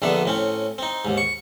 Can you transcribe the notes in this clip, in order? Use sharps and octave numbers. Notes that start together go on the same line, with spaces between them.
A#1 D3 D#3 B3 E5
A2 C4 C#4
C4 D#4
D#2 G#2
C#6